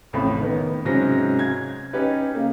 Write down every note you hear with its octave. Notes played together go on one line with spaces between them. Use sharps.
A1 F2 A3 B5
D#3 B3
G#2 C3 F#3 C#4 C5 A#6
G#6
C#4 D#4 G4 B4
C#3 A#3